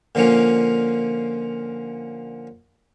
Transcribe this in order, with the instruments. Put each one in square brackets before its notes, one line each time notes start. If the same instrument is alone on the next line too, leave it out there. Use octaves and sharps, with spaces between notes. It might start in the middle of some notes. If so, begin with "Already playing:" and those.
[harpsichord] A#2 D3 F3 A#3 C#4 F4